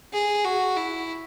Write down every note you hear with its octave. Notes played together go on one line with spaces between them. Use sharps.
G#4
F#4
E4